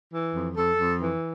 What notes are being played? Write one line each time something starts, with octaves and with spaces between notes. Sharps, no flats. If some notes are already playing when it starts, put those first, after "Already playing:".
E3
F2
F2 A4
F2
E3